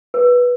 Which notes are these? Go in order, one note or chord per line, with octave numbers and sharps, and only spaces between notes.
B4